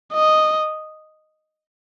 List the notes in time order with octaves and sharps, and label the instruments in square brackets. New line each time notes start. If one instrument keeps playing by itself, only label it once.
[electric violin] D#5